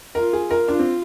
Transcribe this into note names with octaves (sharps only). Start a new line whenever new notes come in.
F4 A#4
G#4
A#4
D4 F4
C4